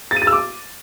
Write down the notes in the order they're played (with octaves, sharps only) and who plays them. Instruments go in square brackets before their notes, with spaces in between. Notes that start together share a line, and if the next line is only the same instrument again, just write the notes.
[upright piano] A6
D#7
A6
E6
D6